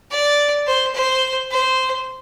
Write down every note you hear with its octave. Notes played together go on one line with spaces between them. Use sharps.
D5
C5
C5
C5